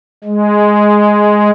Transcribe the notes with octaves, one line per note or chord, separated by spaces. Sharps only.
G#3